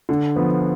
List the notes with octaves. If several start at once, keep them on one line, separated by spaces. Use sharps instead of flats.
D3
F3 B3